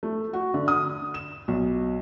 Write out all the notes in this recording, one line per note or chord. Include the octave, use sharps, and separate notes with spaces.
A3
F#4
D3
D#6
E7
B1